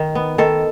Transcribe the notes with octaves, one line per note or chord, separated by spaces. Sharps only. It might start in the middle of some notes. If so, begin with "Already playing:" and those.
Already playing: D#3
B3
D#3 A4